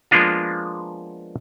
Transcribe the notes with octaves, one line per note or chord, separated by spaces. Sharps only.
F3 G#3 A#3 B3 D4 F4